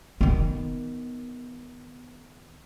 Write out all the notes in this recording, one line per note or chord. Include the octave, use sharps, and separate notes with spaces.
D#3 B3